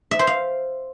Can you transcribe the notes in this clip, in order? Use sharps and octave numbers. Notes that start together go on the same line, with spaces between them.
E5
C5
F5